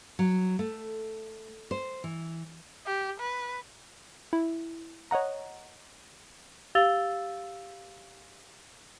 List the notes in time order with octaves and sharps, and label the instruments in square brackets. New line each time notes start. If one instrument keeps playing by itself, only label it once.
[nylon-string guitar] F#3
A3
C5
E3
[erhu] G4
B4
[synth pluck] E4
C#5 D#5 F#5 A#5
[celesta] G4 F5 E6 A6 F7 G7